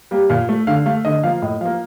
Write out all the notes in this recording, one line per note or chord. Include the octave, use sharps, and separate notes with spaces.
G3 A#3
A#2 F5
A3
D3 F5
A3 F5
D3 D#5
F3 A#3 F5
A2 D#5
F3 A#3 F5